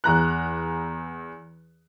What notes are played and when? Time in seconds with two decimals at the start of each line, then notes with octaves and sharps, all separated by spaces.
0.04 E2 A#5 F#6